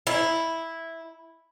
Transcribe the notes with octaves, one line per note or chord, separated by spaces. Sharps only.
E4